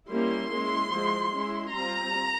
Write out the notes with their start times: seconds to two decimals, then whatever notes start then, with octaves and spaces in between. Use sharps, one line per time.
0.10 G3 A#3 C#4 E4 C6
0.51 G#3 C#4 E4
0.92 F3 G#3 E4
1.32 G#3 C#4 E4
1.74 G3 C4 F4 A#5